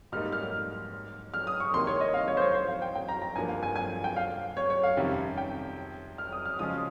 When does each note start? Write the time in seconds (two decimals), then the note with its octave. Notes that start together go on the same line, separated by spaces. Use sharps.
0.12 G#2 G3 A#3 D#4 F6
0.32 F6
1.34 F6
1.47 D#6
1.60 C#6
1.73 C2 C3 D#3 A#3 D#4 C6
1.87 C#5
2.00 D#5
2.14 F5
2.28 C#5
2.37 C5
2.42 C#5
2.55 C5
2.68 F5
2.82 G5
2.95 G5
3.08 A#5
3.22 A#5
3.36 G2 F3 A#3 G#5
3.49 F5
3.63 G#5
3.76 G#5
4.04 G5
4.16 F5
4.57 C#5
4.70 C#5
4.83 F5
4.97 F2 C3 D#3 G3 C#4
5.38 G5
6.18 F6
6.32 D#6
6.45 F6
6.59 C#3 F3 G#3 C#4 F4 D#6